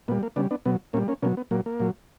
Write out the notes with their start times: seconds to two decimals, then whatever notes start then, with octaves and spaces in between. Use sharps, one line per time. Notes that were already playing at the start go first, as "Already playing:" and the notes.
0.08 A#2 B3
0.12 G3
0.23 A#3
0.36 C#3 G3 B3 D4
0.51 B3 D4
0.65 B2 F#3 B3
0.93 A#2 A#3 C#4
0.97 G3
1.08 A#3 C#4
1.22 B2 F#3 A#3 C#4
1.37 B3
1.51 A#2 F#3 A#3
1.66 A#3
1.80 A#2 F#3